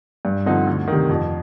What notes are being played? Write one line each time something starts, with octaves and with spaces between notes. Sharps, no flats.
G2
D3 F3 C4 D#4
D2
C3 D#3
F2